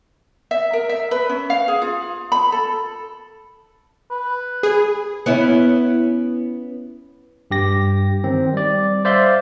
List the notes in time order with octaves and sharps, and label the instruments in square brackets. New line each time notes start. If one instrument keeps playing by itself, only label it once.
[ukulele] E5
A#4
E5
B4
C#4
F5
G#4
F4
B5
A4
[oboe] B4
[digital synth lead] G#4
[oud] B3 C#4 E4
[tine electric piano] G2 G4 A#6
D#3 C4
G3 D5
C5 D5 E5 F5 C6